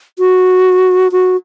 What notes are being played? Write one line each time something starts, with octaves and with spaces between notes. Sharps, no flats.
F#4
F#4